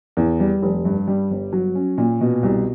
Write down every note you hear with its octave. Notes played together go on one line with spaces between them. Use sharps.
E2
G3
F1
G2
G3
G1
F#3
C#4
A#2
B2
C2